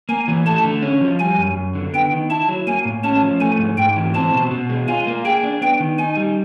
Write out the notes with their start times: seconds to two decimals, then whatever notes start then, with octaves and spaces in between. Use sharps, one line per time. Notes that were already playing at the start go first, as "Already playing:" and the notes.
0.09 A#3 G#5
0.28 E3
0.46 A3 A5
0.64 D3
0.82 C#4
1.01 F3
1.19 G3 G#5
1.38 F#2
1.56 F#2
1.75 D3
1.94 B3 G5
2.12 D#3
2.30 E4 A5
2.48 F#3
2.67 A#3 G#5
2.85 A2
3.04 C#4 A5
3.23 F3
3.40 A3 G#5
3.59 G#2
3.77 G#2 G5
3.96 E3
4.14 C4 A5
4.33 B2
4.51 B2
4.69 G#3
4.88 F4 G#5
5.07 A#3
5.25 G#4 G5
5.43 D4
5.61 B3 G5
5.80 D#3
5.98 D#4 G#5
6.17 G3